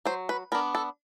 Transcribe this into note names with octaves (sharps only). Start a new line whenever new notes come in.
F#3 C5
B4
B3 D4 A#4
A4